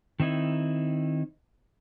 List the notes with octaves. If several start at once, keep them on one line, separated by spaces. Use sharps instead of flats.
D#3 C4 D#4 E4